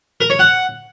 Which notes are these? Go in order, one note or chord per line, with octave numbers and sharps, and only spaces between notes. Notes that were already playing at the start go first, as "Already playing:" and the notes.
A#4
C#5
F#5